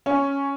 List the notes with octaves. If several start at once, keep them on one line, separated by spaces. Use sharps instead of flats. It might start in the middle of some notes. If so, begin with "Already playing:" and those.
C#4